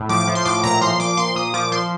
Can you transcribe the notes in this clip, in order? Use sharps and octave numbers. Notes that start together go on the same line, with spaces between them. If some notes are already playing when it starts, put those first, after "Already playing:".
Already playing: A2
F3 D6
F3
C6
A2 D6
A#2 A#5
F3 C6
F3 D6
A#2 C6
A#2 D#6
F3 D6
F3 C6